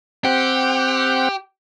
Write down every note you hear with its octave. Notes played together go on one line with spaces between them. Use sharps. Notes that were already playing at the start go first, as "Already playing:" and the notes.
C4 G4 F#5 G5